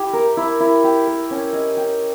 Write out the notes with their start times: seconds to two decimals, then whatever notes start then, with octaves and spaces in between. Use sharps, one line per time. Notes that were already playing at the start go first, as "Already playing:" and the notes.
Already playing: E4 G4
0.13 A#4
0.37 E4
0.60 E4
0.84 G4
1.07 A#4
1.30 C#4
1.53 D#5
1.77 G4